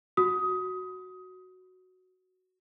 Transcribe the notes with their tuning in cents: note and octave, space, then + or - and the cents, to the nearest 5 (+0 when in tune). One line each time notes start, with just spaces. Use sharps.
F#4 +0 D#6 +20